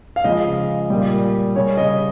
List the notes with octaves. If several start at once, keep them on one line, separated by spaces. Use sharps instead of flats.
F5
C#3 F3 G#3 D#5
A#2 G3
C#3 G3 C#5
D#5